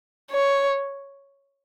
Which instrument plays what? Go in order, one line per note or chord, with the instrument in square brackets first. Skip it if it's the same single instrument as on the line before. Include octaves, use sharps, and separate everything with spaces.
[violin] C#5